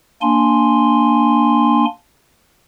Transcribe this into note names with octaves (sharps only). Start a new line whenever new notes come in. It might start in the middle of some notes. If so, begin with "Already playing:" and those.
A#3 D4 G#5 C6